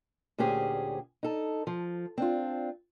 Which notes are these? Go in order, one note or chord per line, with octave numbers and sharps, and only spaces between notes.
D2 A#2 C#4 G4 G#4 C5
D#4 A4
F3
C4 D4 F4